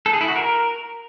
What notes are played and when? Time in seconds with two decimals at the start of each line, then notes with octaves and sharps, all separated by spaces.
0.06 A4
0.13 G#4
0.21 E4
0.28 F#4
0.36 A#4